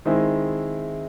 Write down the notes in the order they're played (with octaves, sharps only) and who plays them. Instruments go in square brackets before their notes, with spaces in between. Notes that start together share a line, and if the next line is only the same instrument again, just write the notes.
[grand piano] D#3 G#3 C4 E4